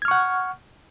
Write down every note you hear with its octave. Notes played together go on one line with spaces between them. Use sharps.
F#5 C#6 F6 G#6